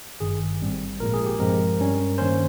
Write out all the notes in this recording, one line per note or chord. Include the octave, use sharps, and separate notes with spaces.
G#1 G2 D#3 G#4
G#1 G#2 G3 C4
A#1 A#2 G#3 A#4
G#4
G4
G2 F3 G#3 C4 A#4
G2 G3 C#4
G2 D#3 A#3 C#4 C5